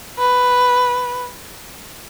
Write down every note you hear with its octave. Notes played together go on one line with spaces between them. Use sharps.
B4